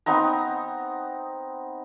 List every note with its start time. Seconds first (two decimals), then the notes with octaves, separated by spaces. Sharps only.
0.06 B3 C4 D#4 A#5